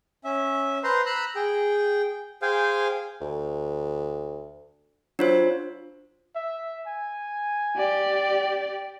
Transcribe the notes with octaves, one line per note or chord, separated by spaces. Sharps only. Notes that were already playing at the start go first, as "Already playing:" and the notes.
C#4 E5
B4 C5 A#5 C6
A#5 B5 E6 F#6
G#4 G5
G#4 C5 F5 G5 G#5
D2
F#3 D4 F4 C5
E5
G#5
G4 D5
G5